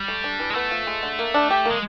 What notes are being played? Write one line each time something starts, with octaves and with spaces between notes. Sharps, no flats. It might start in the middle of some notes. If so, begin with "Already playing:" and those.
Already playing: G3
A3
D4
E3
G#3
A3 B3
F3
G#3
D3
A#3
D4
G4
A#3
G#3